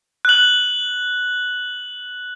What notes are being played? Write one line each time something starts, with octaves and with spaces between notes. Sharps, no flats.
F#6 F#7